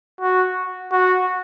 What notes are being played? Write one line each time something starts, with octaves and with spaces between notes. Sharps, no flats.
F#4
F#4